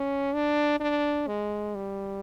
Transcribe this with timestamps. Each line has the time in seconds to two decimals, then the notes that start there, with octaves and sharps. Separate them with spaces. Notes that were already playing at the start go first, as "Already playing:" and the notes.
Already playing: C#4
0.34 D4
0.80 D4
1.27 G#3
1.75 G3